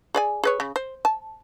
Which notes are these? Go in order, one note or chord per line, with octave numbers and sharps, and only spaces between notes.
G#4 D5 G#5
G#4 B4 C#5
C#3
C5
A5